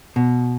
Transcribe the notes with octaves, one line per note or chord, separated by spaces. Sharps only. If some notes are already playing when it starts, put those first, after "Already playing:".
B2